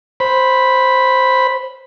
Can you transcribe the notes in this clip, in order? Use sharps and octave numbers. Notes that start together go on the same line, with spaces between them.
C5 B5